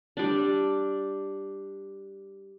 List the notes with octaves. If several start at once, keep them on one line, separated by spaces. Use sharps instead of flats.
G3 D4